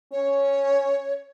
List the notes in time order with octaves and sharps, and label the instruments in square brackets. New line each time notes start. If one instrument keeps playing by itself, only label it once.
[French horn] C#4 [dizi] C#5